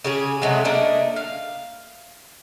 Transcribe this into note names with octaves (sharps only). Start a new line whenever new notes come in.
C#3 G4 G#4
C3 F#3 G#3 A3
A3 A#3 D4 D#5
F5